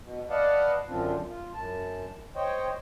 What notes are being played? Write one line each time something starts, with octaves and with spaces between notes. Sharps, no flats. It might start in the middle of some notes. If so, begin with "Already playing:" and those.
B2
B4 D5 D#5 F5 F#5 A5
F#2 D3 F3 C4 D4 F4
F4
F#2 A5
C5 C#5 D#5 G5